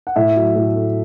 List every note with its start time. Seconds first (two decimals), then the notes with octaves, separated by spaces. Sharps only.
0.07 F#5
0.16 A2 E5
0.36 F#3
0.55 A2
0.75 A3